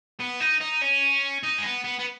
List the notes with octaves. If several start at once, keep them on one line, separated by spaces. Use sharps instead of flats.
B3
D#4
D#4
C#4
D#4
G#3
B3
B3
B3